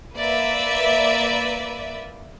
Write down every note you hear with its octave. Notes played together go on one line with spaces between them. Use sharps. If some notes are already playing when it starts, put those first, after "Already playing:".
A#3 B4 D5 E5